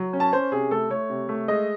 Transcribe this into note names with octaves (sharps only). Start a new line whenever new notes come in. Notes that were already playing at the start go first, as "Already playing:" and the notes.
Already playing: F#3
C#4
A5
C#4 C5
C3 G#4
A3 A4
A3 C#5
C3
A3
G#3 D#5